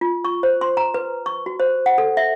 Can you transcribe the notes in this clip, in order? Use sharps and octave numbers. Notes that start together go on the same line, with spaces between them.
F4
C#6
C5
C6
A#5
B4
C#6
F#4
C5
F#5
A4
E5